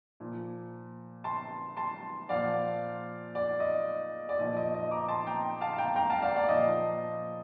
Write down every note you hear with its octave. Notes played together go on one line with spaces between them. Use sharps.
A#2 F3
A5 C6
A5 C6
A#2 F3 D5 F5
D5
D#5
D5
A#2 F3 D#5
D#5
D#5
A#5 D6
A5 C6
G5 A#5
F5 A5
G5 A#5
G5 A#5
F5 A5
D5 F5
D5
A#2 F3 D#5